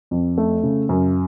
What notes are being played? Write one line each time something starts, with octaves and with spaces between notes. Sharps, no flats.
F2
A3
C#3
F#2